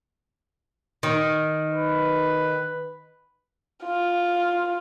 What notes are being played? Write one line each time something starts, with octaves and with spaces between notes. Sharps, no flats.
D#3
B4
F4